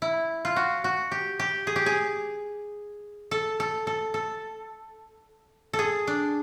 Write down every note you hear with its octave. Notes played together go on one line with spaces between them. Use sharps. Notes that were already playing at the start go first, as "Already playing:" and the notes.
E4
F4
F#4
F#4
G4
G4
G#4
G4
G#4
A4
A4
A4
A4
A4
G#4
D4